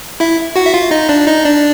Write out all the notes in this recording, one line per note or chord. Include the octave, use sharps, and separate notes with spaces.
E4 E5
F#4 F#5
E5
F4 F5
D#4 D#5
D4 D5
D#4 D#5
D4 D5